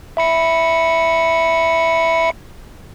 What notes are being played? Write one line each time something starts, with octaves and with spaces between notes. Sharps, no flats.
E5 B5 C#7